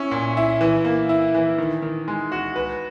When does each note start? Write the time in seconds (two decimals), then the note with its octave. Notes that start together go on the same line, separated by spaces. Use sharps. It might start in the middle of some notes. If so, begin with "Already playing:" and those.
Already playing: C#4 E4
0.11 A#2
0.37 E4
0.61 E3
0.85 A#3
1.09 E4
1.35 E3
1.58 D#3
1.82 D#3
2.08 G#3
2.32 F#4
2.56 B4